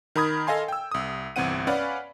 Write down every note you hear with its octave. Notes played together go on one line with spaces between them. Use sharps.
D#3 A#4 B5 D#6 G#6
A4 D#5 F5 G#5 C6
G5 E6
C2 D#6
G1 C2 E3 C4 F#5 D#7
C#4 B4 D5 F5 F#5 B5